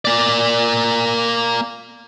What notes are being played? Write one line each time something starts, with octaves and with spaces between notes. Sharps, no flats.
A#3 D5